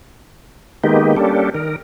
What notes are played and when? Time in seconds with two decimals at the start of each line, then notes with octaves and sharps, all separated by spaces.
0.84 D#3 G#3 A#3 B3 D#4 G4
1.16 G3 A#3 C#4 D4 G4 A4
1.54 D#3 A#4